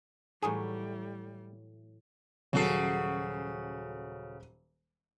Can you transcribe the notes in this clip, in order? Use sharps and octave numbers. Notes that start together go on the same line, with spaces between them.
A2 E3 F#3 G3 G#4
D#1 C#3 F#3 F#4 A4 C7